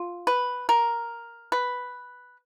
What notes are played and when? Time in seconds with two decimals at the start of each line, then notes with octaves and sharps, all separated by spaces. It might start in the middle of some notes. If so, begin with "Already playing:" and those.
Already playing: F4
0.27 B4
0.69 A#4
1.52 B4